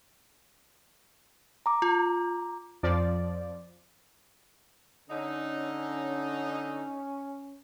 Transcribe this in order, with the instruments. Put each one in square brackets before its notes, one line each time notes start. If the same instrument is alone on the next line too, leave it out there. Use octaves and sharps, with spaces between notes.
[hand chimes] A#5 D6
[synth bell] F4
[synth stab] F2 F3 D5
[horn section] D3 D#4 [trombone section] C#4